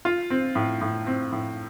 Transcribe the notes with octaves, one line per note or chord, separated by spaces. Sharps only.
F4
C4
A2
A2
C4
A2